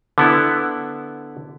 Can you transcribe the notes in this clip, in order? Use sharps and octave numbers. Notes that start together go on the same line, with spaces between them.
D3 B3 E4